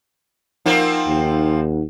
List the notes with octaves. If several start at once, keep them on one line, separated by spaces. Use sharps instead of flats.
F3 A#3 C4 D#4 F#5
D#2